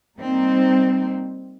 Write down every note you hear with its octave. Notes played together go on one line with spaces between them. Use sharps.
G3 A#3 C4 D#4